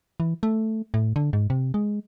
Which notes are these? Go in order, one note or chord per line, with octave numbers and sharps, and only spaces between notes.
E3
A3
A2
D3
G#2
C3
G#3